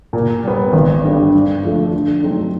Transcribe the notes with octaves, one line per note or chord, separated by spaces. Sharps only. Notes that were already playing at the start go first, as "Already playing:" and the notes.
A#2
G3 B3
G#1
G2 D3 G3
G2
D3 F3 A3
D3
F#3 A3 C4 D#4